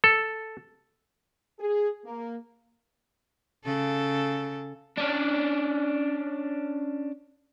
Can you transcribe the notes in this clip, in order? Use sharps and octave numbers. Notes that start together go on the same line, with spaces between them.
A4
G#4
A#3
C#3 A4
C#4 D4